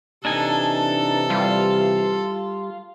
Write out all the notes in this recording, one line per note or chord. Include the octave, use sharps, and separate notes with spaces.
C3 E3 D4 D#4 G4 A4 G#5
G3 F4